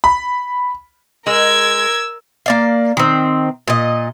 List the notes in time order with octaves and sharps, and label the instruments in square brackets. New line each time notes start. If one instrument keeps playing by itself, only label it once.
[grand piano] B5
[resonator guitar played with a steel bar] G#3 [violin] A#4 G#6 [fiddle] E6
[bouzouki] A#3 D5 F5
D#3 C4
A#2 D#5